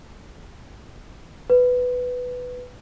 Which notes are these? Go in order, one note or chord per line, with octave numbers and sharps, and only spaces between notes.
B4